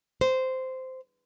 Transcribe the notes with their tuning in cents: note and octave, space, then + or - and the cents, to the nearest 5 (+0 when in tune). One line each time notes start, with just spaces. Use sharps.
C5 -10